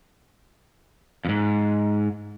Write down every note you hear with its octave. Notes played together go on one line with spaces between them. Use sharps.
F2 G#2